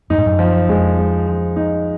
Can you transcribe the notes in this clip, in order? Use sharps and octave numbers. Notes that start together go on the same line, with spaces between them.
F#2 D#4
G#2
F#2
F3
F2 G#3
G#3
F3
D#4